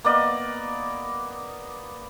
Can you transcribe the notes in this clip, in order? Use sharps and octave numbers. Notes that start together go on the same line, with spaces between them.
A#3 B3 D5 D#5